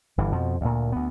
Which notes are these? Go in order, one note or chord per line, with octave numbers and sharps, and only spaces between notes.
G1 G2 E3
F2 B2 F3
D2 A#2
D2 B3